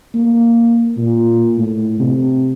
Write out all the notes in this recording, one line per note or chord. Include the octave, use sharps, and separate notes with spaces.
A#3
A#2
A2
C3